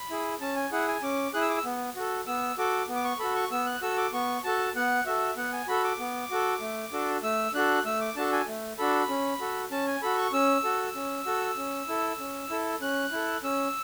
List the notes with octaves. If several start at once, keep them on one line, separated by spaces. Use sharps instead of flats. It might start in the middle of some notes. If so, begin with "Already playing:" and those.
Already playing: B5
E4 G#4
C#4 A5
G#5
E4 G#4 F#5
G#5
C#4 D6
E4 G#4 F#6
E6
D6
E6
B3
F#4 A4
B3 E6
F#4 A4 D6
B3
D6
C#6
F#4 A4 B5
C#6
B3 E6
F#6
F#4 A4 E6
D6
B3 C#6
F#4 A4 A5
B3 F#5
F#4 A4 E5
B3 F#5
G#5
F#4 A4 B5
D6
B3
F#4 A4
A3
D4 F#4 A4
A3 E6
D4 F#4 A4 F#6
A3 E6
D6
D4 F#4 A4 A5
G#5
A3
D4 F#4 A4 B5
C#4
F#4 A4
C#4 A5
G#5
F#4 A4 B5
C#6
C#4 E6
F#4 A4
C#4
F#4 A4
C#4
E4 A4
C#4
E4 A4
C#4 F#6
E4 A4
C#4 E6